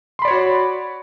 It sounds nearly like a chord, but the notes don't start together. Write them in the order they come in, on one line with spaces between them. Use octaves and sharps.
C6 B5 D5 C#5 F#4